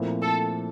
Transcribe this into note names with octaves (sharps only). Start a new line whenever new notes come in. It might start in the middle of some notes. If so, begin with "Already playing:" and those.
Already playing: A#2 F3 A3 C4 E4
A4